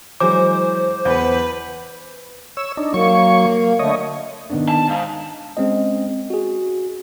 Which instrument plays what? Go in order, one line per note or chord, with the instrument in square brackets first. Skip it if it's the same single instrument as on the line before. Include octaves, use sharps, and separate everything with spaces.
[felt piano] E3 F#3 G#3 [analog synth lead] C5 [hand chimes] D6
[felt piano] E2 G6 [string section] B4
[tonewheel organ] C#5 E6
D4 D#4
[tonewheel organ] F#3 C#5 C#6 [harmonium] A#3
[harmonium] D3 A3 [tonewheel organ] C#5 D#5
[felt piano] D#3 B3 D4
[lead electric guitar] A5
[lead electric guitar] G#2 [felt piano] F5
[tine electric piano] G#3 C4 C#4 D#5
F#4 G#4